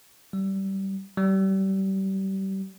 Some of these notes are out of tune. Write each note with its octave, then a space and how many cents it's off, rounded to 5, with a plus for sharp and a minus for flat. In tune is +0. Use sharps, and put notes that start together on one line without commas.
G3 -20
G3 -30